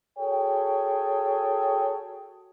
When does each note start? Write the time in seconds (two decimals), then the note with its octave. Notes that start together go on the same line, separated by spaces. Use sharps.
0.18 F#4 G#4 A4 C#5 G5